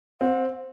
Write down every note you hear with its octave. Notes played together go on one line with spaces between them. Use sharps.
C4 F#5